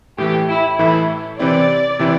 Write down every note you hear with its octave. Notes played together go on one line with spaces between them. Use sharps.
A2 E3 A3 G4
E4
A2 E3 A3 E4
C3 E3 C4 E4 D5
C3 E3 C4 E4